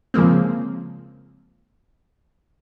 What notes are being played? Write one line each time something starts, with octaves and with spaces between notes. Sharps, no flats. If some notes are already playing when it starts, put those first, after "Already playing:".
C#3 F3 G#3 A#3 C4